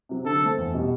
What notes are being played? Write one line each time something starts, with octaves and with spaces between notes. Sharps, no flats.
C3 F#3
D3 A4
A3 C4
E2
B2 G3